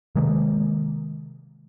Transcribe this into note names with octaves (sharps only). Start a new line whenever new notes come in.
C3 D#3 G#3 A#3